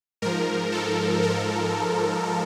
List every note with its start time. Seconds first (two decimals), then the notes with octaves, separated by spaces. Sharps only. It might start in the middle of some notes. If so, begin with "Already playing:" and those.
0.22 G#2 F3 A#4
0.72 A4
1.23 A#4